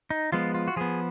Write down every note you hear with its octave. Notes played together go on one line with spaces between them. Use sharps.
D#4
F3 G#3 B3 F4
F4
F#4
F3 B3 G#4